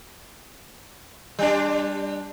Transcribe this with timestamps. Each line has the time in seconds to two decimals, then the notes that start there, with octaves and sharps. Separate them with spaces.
1.39 G3 D4